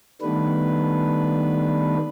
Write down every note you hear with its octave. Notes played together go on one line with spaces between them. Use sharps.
D#3 G3 A3 B3 D4 B4